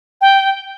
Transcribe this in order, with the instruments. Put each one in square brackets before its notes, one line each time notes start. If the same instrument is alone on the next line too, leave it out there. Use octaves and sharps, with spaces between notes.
[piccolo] G5